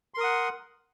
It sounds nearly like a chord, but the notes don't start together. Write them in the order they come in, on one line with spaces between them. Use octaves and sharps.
C6 A#4 D#6 F#5